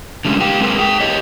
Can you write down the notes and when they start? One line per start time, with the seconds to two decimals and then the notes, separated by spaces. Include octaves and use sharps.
0.25 D3 G3 G#3 C#4
0.41 G4 F5 G5
0.60 G#3 C4 G#4 A#4 B4
0.77 G#4 F#5 G5
1.00 G4 C#5 D#5